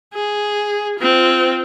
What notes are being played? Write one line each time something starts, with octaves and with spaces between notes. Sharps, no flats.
G#4
C4 F4